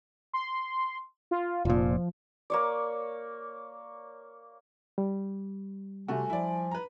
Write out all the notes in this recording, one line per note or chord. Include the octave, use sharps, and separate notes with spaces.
C6
F4
F1 A#2 F3
A#3 C#5 D5
G3
C3 A3 F#4 G#5
F3 E4 D5
B4 A#5